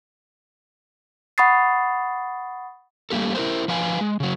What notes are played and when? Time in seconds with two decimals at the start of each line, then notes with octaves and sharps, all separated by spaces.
1.38 F#5 B5 C#6 D#6 A6 C7
3.10 G3 A3 A#3 G4 A4
3.35 E4 A#4 C5
3.68 F3 B4 F5 G#5
4.01 G#3
4.20 C#3 F#3